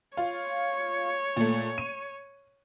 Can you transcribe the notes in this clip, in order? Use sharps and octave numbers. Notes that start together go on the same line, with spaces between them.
F4 C#5
A#2 A3
D#7